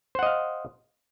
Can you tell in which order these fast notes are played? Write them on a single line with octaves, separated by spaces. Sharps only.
C5 F#5 D#5 F5